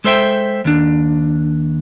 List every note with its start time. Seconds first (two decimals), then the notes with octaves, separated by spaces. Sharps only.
0.04 G#3 A4 C5 E5 G5
0.65 D#2 D4